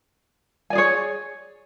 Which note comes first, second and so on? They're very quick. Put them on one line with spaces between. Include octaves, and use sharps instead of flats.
G#5 D5 G#4 C#5